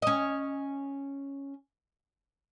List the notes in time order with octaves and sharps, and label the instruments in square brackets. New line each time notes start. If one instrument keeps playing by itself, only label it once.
[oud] C#4 D#5